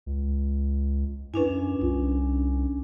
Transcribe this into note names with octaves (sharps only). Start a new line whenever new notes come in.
C#2
F#2 C#4 D4 E4 B4 G#5
C2 F4